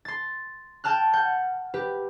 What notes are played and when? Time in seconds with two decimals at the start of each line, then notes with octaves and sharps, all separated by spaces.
0.05 C6 A6
0.84 G5 A5 F6 F#6
1.13 F#5 G6
1.74 G4 B4